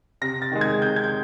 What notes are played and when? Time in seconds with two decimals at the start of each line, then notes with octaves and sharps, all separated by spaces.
0.21 C3 A#6
0.42 A6
0.52 D#3 G#3
0.61 G#6
0.81 C3 G6
0.96 G#6
1.04 G6